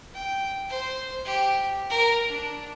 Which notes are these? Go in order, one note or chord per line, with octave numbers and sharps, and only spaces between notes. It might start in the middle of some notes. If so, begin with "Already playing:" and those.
G5
C5
G4
A#4
D4